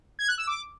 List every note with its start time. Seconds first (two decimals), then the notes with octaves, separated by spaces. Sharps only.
0.19 G#6
0.28 F#6
0.38 E6
0.47 D6